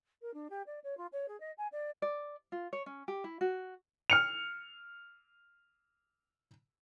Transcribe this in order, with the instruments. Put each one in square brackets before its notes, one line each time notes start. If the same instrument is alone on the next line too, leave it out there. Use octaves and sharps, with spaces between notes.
[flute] A#4
D4
G4
D5
C#5
F4
C#5
G#4
D#5
G#5
D5
[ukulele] D5
F4
C#5
C#4
G4
E4
F#4
[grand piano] F6 C#7 F7